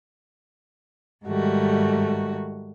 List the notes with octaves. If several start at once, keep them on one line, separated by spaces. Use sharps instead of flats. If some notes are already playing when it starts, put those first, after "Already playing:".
G#2 D#3 G3 A3 F#4